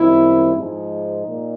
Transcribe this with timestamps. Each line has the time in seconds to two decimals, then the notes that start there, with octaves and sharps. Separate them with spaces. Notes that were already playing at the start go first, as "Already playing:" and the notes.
Already playing: F#2 D#3 G3 C4 E4
0.54 G#2 F3 G#3 D#4
1.26 A#2